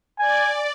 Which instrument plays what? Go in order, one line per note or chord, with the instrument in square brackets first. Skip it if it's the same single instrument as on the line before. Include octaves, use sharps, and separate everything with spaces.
[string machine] D5 [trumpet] G#5